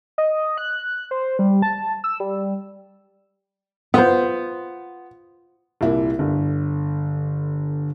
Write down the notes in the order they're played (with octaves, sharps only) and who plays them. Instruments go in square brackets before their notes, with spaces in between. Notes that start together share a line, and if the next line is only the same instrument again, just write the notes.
[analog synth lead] D#5
F#6
C5
G3
A5
E6
G3
[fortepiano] B3 [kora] F4 C5
[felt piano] C2 A#2 E4
[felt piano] G1 [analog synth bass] D3